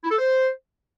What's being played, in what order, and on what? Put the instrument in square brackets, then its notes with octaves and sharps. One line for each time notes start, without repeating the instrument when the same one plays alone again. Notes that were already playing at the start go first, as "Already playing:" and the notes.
[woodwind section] E4
A4
C5